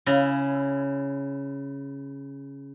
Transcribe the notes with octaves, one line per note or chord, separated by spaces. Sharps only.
C#3 E4